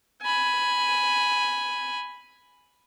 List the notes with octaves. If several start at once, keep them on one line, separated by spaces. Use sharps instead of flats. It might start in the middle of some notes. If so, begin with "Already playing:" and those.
G#5 B5